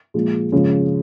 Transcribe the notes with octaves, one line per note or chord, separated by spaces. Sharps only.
A#2 F3 G#3
C#3 F3 G#3 C#4